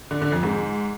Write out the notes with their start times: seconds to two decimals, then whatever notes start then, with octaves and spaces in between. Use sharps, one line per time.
0.11 D3
0.22 D3
0.32 F2
0.43 G#2